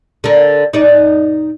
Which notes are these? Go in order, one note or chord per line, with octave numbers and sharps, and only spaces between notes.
D3 A#4
D#4 D5